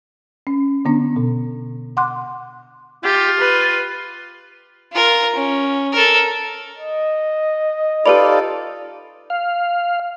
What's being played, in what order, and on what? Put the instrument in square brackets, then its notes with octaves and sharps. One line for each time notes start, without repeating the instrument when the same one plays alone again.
[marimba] C#4
D3 B3 D4
B2
F#5 C6 D6 F#6
[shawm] F4 [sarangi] G4
[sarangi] B4
[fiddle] F4 A#4
C#4
A4 A#4
[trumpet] D#5
[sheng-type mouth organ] D#4 F4 A4 [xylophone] G4 B4 B5 [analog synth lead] D5
[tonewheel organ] F5